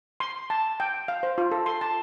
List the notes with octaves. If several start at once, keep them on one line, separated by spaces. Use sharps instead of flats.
C6
A5
G5
F5
C5
F4
A4
C6
A5